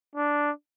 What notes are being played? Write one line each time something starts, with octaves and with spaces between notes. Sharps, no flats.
D4